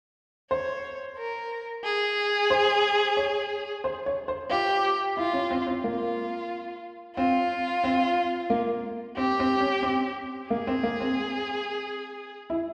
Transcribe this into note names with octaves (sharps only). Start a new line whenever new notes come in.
C5 C#5
A#4
G#4
C5
C#5
C5
C#5
C5
F4 G4
E4 F4
C#4
C4
C4
A#3 F4
C4 F4
C4
A#3
C4 G4
C4
C#4
C4
A#3 G#4
C4
A#3
C4
E4